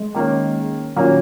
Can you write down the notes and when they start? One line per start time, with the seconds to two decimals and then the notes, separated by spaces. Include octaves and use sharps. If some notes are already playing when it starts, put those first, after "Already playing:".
Already playing: G#3
0.14 D#3 A#3 C#4
0.95 A#2 D#3 F#3 A#3 C#4